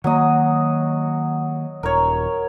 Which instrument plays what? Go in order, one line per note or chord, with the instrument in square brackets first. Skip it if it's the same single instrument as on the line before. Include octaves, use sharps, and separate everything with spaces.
[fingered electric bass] D#3 A#3 [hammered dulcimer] F#3 D#5
[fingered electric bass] D#1 [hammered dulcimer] A#4 C#5